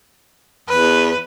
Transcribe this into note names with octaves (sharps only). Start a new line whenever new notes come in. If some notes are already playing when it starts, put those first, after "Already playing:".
E2 B4